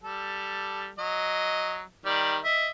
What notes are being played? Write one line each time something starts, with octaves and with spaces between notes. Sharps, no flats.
G3 A4
F#3 D#5
D#3 G3 D5
D#5 E5